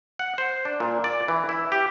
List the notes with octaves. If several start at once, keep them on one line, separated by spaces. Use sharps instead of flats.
F#5
C5
D4
A#2
D5
E3
E4
G4